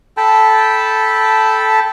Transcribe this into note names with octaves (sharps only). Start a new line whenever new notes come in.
A4 G5 A5 B5